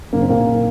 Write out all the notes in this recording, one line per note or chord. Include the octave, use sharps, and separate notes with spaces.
F#1 F#2 D#3 A#3
C4
A#2 A#3
D#3